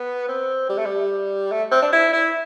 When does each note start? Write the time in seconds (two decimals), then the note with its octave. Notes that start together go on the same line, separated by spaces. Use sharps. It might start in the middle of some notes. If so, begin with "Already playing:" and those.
Already playing: B3
0.29 C4
0.69 G3
0.78 A3
0.86 G3
1.52 A3
1.72 C4
1.82 D4
1.93 E4
2.13 E4